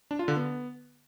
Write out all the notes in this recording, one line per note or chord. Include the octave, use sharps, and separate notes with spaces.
D4
F4
D3
B3